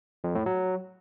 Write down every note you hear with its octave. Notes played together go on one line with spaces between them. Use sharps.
F2
A2
F#3